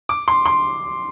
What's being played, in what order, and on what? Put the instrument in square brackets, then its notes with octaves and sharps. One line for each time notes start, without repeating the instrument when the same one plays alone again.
[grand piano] D6
C6
C6